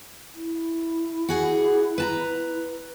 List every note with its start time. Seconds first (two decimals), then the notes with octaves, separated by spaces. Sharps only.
0.34 E4
1.29 F#4 G#4 F#5
1.98 B4 A5 A#5